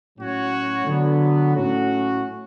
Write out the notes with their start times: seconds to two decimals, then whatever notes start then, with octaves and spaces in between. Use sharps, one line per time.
0.17 A2 F#3 C#4 F#4 C#5
0.86 D3 F#3 B3 F#4
1.55 A2 F#3 A3 C#4 F#4